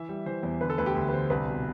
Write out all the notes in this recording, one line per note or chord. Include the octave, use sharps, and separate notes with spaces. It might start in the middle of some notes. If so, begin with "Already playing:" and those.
Already playing: E3 E5
G3
E3 C5
E2
D3 B4
A4
D2 B4
G4
D2
B4
D3 C5
C2 B4
B2